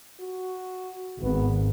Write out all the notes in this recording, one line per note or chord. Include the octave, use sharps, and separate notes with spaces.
F#4
G#1 B3